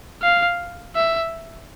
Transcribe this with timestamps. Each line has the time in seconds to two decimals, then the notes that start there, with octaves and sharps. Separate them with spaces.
0.22 F5
0.96 E5